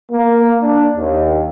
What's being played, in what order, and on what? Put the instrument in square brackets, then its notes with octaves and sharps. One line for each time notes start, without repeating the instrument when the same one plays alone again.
[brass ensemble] A#3
D4
D#2